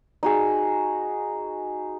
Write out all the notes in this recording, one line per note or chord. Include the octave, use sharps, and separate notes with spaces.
D#4 F#4 G#4